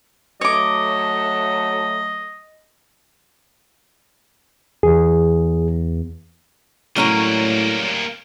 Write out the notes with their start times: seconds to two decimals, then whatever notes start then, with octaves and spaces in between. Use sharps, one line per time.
0.41 F#3 A3 C#5 D#5 D6
4.83 E2 G#4
6.96 A2 F#3 G3 A#3 C#4 A#5